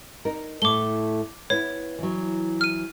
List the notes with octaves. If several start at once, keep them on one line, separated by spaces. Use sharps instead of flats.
D#4 A#4
A2 A3 D6 G7
B3 E4 C#5
E3 F#3
F6 D#7